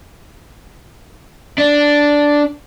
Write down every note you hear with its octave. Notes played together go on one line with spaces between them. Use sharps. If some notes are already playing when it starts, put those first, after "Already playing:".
D4